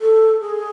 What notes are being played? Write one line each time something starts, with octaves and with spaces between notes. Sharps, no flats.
A4
G#4